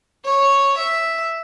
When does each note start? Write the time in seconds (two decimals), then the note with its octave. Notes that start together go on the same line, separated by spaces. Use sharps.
0.25 C#5
0.77 E5